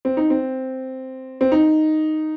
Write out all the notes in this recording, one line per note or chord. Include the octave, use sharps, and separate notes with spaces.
C4
D#4
C4
C4
D#4